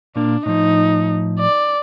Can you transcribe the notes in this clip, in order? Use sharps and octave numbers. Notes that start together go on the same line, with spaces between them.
A#2 A#3 D4
A2 F3 D#4
D5